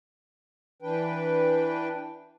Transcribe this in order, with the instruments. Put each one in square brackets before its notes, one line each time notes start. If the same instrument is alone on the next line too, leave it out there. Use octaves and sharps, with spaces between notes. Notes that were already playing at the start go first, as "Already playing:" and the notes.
[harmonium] E3 D4 B4 G5